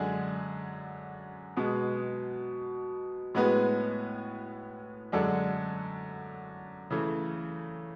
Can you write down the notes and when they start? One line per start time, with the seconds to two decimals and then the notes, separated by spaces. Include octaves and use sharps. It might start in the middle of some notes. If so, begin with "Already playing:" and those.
Already playing: F#2 D3 G#3 D4 G#4
1.57 B2 G#3 B3
3.35 A2 G#3 B3 F#4 B4
5.12 F#2 D3 G#3 D4 A4
6.91 C#3 E3 A3